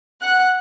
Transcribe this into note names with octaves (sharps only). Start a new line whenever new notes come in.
F#5 F#6